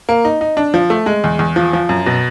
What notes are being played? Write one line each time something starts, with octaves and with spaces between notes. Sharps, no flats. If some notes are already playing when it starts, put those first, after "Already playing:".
A#3
D#4
D#4
D4
F3
A3
G#3
E2
E2
F3
F3
F#2
B2